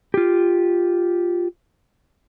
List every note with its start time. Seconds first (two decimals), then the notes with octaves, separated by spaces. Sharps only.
0.14 F4 G4